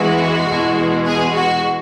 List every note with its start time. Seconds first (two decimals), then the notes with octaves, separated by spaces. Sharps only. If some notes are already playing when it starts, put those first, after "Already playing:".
Already playing: E2 E3 G#3 F#4
0.46 E2 B2 G#3
1.04 G#4
1.34 F#4